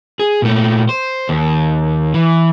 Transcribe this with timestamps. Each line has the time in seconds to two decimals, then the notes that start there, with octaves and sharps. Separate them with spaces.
0.19 G#4
0.42 A#2 A3
0.89 C5
1.29 D#2
2.14 E3